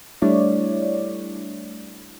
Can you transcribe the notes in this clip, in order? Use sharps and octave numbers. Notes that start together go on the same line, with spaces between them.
G3 A3 D4 E4 C#5 D5